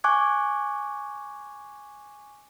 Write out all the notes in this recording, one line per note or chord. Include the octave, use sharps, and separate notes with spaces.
G#5 C#6 D6 F#6 G#6